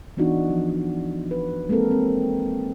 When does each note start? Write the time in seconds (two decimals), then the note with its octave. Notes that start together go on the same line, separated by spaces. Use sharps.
0.17 E3 B3 D4 D#4 F#4
0.49 F3
1.31 B4
1.69 G#3 A#3 C4 A4 A#4
1.91 C4